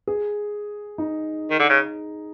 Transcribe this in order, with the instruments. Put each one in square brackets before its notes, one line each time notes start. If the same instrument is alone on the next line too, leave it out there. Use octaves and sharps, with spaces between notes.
[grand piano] G#4
D#4
[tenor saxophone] D#3
D3
C#3